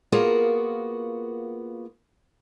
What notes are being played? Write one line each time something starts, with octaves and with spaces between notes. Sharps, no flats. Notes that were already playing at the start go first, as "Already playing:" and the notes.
A#3 B3 F4 F#4 G#4 A#4